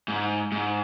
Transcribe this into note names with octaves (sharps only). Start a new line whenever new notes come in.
G#2
G#2